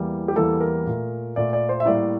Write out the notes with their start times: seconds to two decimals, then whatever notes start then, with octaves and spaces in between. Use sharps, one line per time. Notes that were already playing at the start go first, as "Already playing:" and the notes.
Already playing: E2 E3 G3 A#3
0.28 G4
0.36 E2 E3 G3 A#3 A4
0.61 A#4
0.86 A#2 A3
1.36 A#2 A3 D5
1.53 D5
1.69 C5
1.80 E5
1.86 A2 G3 A#3 D5